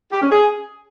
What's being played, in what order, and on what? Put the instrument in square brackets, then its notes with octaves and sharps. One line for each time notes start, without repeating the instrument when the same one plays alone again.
[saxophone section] G4
C#4
G#4